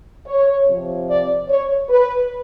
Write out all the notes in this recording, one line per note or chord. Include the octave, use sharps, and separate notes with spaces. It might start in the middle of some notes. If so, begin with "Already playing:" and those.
C#5
C3 F3
D5
C#5
B4